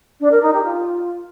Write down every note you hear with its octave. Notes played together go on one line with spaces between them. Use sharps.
D4
A#4
D#4
G4
F4